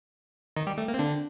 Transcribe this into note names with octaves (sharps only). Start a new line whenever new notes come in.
D#3 D#4
G3 G4
A3
A#3
C4
D3 D4